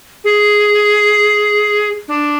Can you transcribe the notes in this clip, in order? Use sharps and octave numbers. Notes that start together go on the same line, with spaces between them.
G#4
D4